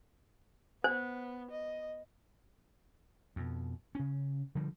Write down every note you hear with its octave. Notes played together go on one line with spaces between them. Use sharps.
B3 C5
D#5
F2 B2
C#3 C#4
D3 F3 G3